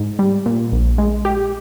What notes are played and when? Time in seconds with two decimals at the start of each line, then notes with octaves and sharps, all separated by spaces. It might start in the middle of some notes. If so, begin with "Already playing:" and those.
Already playing: G#2
0.19 G3
0.46 A#2
0.72 A#1
0.98 G#3
1.25 G4